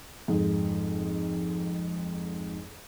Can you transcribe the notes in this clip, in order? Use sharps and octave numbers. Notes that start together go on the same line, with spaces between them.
F2 G#2